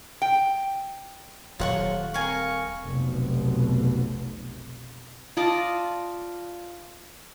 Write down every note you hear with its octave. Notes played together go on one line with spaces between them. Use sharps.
G5
D#1 F3 F#3 F4 C#5 F#5 C#6
C4 A#4 F5 G#5 C#6
F1 B1 B2
F4 D5 D#5 A5